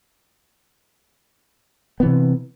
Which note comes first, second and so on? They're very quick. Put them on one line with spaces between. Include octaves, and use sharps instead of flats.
B3 E3 C3